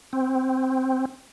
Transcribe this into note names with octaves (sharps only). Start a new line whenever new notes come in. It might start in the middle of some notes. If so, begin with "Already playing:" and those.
C4